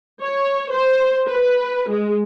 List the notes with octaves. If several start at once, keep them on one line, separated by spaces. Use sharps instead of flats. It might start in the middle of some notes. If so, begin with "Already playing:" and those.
C#5
C5
B4
G#3